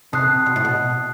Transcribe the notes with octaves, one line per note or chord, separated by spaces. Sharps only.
C3 A5 D#6 F#6 C7
B2
A2
B2